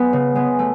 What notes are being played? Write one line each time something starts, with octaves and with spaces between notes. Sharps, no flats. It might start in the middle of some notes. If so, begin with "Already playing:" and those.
Already playing: G#3 B3
C#3
G#3 B3
A3